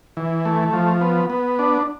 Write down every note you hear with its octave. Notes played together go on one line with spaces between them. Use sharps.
E3
A3
F3
B3
B3
D4